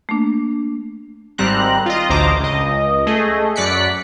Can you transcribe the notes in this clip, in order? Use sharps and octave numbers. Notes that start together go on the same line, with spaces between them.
A3 A#3 D4
G#1 G3 C4 A#5 F#6
F4 D#5
A1 D2 C5 D#5 A#5 D6
C#2 D#5
A3 G#4 D#5
F#2 D5 F#6 B6 C#7